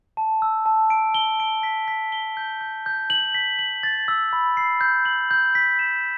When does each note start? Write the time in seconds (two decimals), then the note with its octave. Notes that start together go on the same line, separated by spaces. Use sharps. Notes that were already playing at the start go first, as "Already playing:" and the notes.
0.17 A5
0.42 E6
0.66 A5
0.90 D7
1.14 G7
1.40 D7
1.63 B6
1.88 B6
2.12 G7
2.37 G6
2.61 G6
2.86 G6
3.10 F#7
3.35 B6
3.59 F#7
3.83 A6
4.08 E6
4.33 B5
4.57 C7
4.81 G6
5.05 F#7
5.31 G6
5.55 B6
5.79 E7